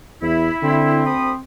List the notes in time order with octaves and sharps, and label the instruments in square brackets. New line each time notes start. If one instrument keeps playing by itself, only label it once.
[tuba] E2 [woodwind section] E4
[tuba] D3 [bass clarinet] C4
[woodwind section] D2 B5 D#6